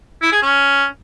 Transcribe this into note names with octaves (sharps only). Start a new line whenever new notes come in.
E4
G#4
C#4